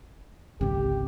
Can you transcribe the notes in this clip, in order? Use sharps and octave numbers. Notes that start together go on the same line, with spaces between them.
G#1 C#2 D3 C4 G4